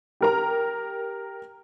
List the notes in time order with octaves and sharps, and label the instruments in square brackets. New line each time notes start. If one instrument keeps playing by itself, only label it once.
[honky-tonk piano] G4 A#4 A#5